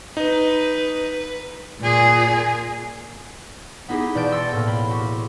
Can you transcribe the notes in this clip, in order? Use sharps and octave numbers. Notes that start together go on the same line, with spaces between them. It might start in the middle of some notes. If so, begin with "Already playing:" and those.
D#4 B4
A#2 G#4
B3 D#4 E4 G4 G#4
E1 D5 A5 G6 D7
C6 E6 A6 A#6 C#7
A2 A#3
B5 C6
F#4 G4